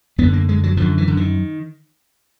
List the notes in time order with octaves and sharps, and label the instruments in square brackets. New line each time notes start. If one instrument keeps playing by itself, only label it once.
[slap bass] F#2 B3
D3
A#3
G#3
F#3
F#2 D3 F3
E3
D3
D#3